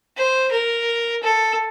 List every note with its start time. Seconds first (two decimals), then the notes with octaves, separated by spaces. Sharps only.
0.17 C5
0.51 A#4
1.22 A4